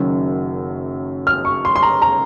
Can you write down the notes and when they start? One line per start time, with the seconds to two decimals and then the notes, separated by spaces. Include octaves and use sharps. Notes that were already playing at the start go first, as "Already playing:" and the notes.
Already playing: F#1 F#2 D#3 F#3
1.27 F6
1.45 C#6
1.65 C6
1.76 C6
1.83 A#5
2.02 A#5